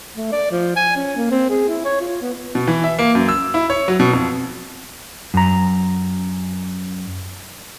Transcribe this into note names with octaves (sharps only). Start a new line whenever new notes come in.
A3
D5
F3
G#5
C#4
A#3
C4
G#4
E4
C#5
F4
B3
B2
E3
E5
A#3
F#2
E6
E4
C#5
F#3
B2
F2
F#2 A#5